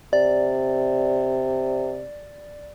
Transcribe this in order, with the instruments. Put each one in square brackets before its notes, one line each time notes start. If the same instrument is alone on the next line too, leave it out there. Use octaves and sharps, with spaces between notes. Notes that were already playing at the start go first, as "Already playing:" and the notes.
[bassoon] C3 [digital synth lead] D5